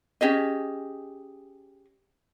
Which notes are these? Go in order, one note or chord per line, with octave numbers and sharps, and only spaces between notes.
C#4 G4 G#4 D#5